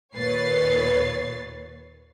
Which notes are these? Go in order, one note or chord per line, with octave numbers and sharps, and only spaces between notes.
D#2 A#2 B4 C#5 A6 C7